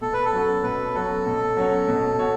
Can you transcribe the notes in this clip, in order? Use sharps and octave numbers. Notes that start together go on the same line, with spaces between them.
B2 A4
B4
A4
F#3 C#4 F#4 C#5
B2 B4
F#3 C#4 F#4 A4 C#5
B2
F#3 C#4 F#4 C#5
B2
F#4 C#5